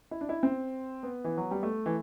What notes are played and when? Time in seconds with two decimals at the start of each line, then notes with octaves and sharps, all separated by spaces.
0.11 E4
0.21 D4
0.29 E4
0.43 C4
1.03 B3
1.24 E3
1.37 F#3
1.51 G3
1.63 A3
1.86 E3